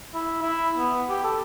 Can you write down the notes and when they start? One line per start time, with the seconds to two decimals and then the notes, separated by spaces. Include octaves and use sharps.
0.14 E4
0.42 E4
0.77 B3
1.09 G4
1.24 A4